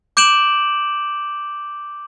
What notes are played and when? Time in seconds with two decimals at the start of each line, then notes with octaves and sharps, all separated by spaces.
0.17 D6 G6 D7 E7 F#7